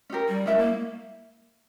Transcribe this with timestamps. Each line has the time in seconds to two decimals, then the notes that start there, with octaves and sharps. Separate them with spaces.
0.10 C#4 G4 A#4
0.28 G3
0.46 G#3 C#4 E4 A#4 E5
0.58 A#3